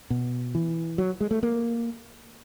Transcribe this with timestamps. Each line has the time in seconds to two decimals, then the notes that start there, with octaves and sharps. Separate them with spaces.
0.10 B2
0.55 E3
0.98 F#3
1.21 G#3
1.31 A3
1.43 A#3